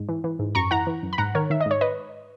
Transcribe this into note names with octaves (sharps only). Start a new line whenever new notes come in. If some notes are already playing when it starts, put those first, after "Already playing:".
Already playing: G#2
E3
E3
G#2
F#2 A#5 C#6
E3 F#5 A#5
E3
F#2
B5
G#2 F#5 A#5
D#3 A#4 C#5
D#3 E5
D#5
G#2
C#5
B4 D#5